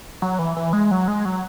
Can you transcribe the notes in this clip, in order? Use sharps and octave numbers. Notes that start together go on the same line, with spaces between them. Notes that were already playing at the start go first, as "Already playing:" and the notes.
F#3
E3
E3
G#3
F#3
G#3
F#3